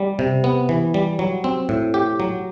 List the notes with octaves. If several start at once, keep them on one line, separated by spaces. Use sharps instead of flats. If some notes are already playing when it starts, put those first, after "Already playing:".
Already playing: G3
C3
B3
E3
G3
F#3
C4
A2
G4
F#3